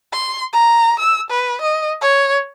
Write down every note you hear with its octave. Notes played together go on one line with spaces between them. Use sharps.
C6
A#5
E6
B4
D#5
C#5